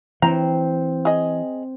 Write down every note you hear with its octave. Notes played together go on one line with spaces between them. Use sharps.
E3 C4 A#5
G#4 D#5